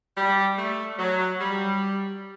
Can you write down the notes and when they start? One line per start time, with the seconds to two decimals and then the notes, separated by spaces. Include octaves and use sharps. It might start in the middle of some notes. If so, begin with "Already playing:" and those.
0.17 G3
0.57 A3
0.99 F#3
1.40 G3